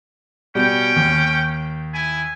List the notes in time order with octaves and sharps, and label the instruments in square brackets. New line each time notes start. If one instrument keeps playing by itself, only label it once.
[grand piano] B2 G3 [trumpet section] C#4 G5
[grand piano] D#2
[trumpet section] E4 G#5